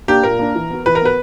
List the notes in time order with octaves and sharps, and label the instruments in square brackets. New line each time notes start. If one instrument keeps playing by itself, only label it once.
[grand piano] A#3 D4 [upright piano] G4
[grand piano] A#2 [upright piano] A#4
[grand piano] A#3 D4
E3
B3 F#4
[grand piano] E3 [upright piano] B4
[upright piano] A#4
[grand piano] B3 F#4 [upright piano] B4